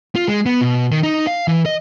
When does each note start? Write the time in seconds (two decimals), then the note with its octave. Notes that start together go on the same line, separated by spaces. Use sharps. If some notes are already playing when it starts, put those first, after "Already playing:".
0.16 F4
0.28 G#3
0.46 B3
0.61 B2
0.91 D#3
1.03 D#4
1.27 F5
1.47 E3
1.66 D#5